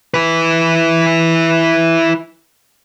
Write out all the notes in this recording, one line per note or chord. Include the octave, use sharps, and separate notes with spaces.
E4 B4